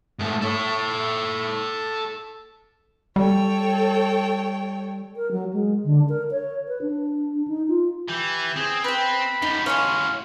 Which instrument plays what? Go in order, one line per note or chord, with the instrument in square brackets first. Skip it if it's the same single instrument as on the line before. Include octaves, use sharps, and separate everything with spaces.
[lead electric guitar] G#2 A3
A4 C#5
[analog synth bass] G3 [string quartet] A4 C#5 G5
[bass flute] A#4
F#3
G#3
D3
A#4
C#5
B4
D4
D#4
F4
[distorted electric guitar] E3 [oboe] G4
[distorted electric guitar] C4 [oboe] G#4
[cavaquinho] B4 G5 [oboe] B5
[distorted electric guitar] F#2 A2 [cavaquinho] D#4
[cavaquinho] C#5 G#5 C6 [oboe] F5